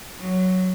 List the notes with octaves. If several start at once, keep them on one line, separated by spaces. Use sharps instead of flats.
F#3